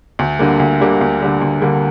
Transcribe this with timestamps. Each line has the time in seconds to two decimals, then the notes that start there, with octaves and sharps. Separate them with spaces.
0.19 D2
0.39 D3 G3 A#3
0.60 D2
0.80 D3 G3 A#3
1.01 D2
1.21 D3 G3 A#3
1.41 D2
1.61 D3 G3 A#3